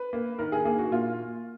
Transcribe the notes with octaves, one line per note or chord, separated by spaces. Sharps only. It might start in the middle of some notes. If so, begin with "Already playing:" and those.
Already playing: B4
A#3
D#3 A#4
G#4
A#3 G#4
F#4
A#2 F4